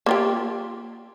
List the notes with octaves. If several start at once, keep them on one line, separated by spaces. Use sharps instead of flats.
A#3 F4 G4